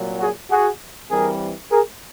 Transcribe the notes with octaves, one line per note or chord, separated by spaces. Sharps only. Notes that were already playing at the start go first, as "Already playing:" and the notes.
Already playing: C2 A#2 F#3
F#4 G#4
F#4 G#4
G2 E3 G3 C4 G#4 A#4
G#4 A#4